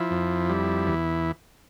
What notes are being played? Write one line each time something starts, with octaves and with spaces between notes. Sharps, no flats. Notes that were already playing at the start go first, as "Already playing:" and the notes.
Already playing: F3 E4
F2
G3
E2